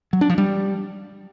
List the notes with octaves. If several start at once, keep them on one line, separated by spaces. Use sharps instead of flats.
F#3
D4
F3
G3